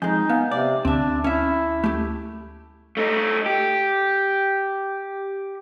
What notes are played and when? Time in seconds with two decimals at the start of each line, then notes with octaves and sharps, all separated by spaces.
0.02 F2 G#3 D#4 G#5 G6
0.29 B3 F5 G#5
0.51 C3 D5
0.85 D2 C4 D4 E5
1.24 C#4 E4 E5
1.84 A3 G4
2.97 A3 D#4
3.46 G4